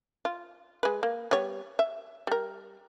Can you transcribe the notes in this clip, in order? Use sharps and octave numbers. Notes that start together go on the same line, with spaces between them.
F4
G#3 B4
A#3
G3 B3 C#5
E5
G3 A#4